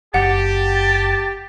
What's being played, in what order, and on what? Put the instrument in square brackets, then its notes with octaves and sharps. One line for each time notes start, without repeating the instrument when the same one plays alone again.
[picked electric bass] F#1 [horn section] G4 [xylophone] F#5 [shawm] A5